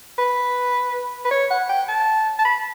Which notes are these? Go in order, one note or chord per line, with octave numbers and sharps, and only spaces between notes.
B4
B4
C#5
F#5
G5
A5
A5
B5